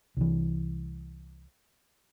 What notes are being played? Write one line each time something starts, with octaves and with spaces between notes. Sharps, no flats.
C2 E3